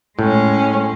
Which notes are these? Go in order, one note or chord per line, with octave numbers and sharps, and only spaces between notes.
A2 G#3 C#4